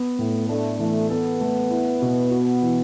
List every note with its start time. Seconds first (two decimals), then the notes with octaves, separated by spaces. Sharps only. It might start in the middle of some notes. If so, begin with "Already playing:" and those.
Already playing: B3
0.19 A2 A3
0.49 A3 D4
0.79 E3 A3
1.10 B3 A4
1.41 A3
1.70 E4
2.02 B2
2.31 F#4
2.62 E3